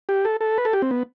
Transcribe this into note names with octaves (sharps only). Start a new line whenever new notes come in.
G4
A4
A4
B4
A4
G4
C4
B3